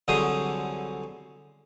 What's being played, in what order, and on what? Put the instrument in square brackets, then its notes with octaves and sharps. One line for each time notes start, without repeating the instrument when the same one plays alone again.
[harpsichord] C2 D3 F#3 G#4 C5 D#6